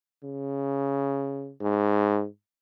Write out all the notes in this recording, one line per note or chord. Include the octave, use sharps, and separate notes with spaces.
C#3
G#2